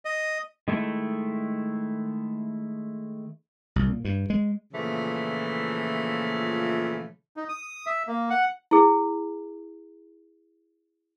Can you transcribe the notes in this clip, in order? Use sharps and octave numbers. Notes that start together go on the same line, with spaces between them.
D#5
D#3 G#3 A3 E4 A4
C2
A#2
G2
G#3
A#2 C#3 E3 F3 A3
D#4
D#6
E5
A#3
F#5
E4 G#4